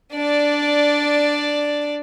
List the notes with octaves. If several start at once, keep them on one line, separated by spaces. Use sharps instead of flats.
D4 D5